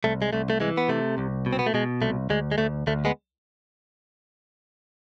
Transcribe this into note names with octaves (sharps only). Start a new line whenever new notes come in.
C2 A3
G#3
C2 A3
A3
E3 G#3
B3
C3 A3
C2
B2
C4
B3
A3
B2 G#3
C2 A3
D2 G#3
G#3
D2 A3
D2 A3
G#3 B3